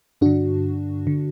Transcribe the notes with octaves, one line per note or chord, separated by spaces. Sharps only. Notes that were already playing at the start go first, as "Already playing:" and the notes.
G2 D3 D4 F#4
D3